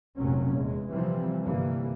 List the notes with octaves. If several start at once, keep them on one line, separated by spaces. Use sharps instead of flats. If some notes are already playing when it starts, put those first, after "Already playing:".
F1 A#1 F2 A#2 F#3 C#4
E2 G#3
C3 E3 F3 G3 C4
G1 C3 E3 G3 A#3